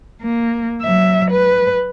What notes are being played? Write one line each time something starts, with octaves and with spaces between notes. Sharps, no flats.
A#3
F#3 E5
B4